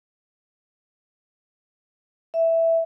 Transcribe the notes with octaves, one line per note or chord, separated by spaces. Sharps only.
E5